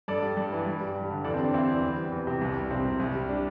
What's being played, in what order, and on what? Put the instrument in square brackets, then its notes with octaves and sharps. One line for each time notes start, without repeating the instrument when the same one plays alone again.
[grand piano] G2 A4 D5
G3
G2
E3
G2
G3
G2
D3
E2 A4 D5
C4
G3
D4
E2 C4 E4
E3
E2
G3
E2
C3
C2
G3
C2 C4
C3
C2
G3
D4